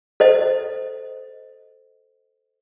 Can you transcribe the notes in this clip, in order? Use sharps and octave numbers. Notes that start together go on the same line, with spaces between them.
A4 C5 D#5